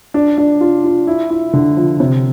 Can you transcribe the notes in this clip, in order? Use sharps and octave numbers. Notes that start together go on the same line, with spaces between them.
D4
D4
F4
F4
E4
E4
D3
F3
C3